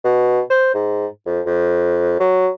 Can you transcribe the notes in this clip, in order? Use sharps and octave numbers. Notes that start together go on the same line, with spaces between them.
B2
C5
G#2
F2
F2
F#3